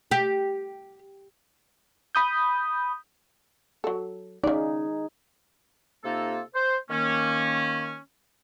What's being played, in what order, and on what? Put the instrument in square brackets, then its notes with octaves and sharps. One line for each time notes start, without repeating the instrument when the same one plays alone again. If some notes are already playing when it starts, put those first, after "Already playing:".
[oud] G4
[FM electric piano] B5 D#6 G6
[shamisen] F#3 A4
[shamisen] C#3 D5 [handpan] D#4 G#4
[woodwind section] C3 A#3 D#4 F4 A4
C5
D#3 A#3 C#4